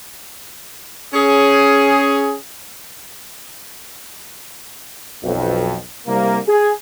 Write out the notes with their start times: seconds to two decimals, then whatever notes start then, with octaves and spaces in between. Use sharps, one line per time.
1.14 C#4 G#4
5.23 B1 F2
6.07 C2 A#3
6.47 G#4